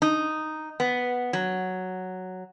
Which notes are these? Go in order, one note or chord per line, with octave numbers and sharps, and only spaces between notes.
D#4
B3
F#3